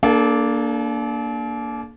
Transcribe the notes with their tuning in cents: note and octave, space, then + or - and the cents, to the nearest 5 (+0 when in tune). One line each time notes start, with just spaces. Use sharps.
A#3 +0 D4 -10 A4 -45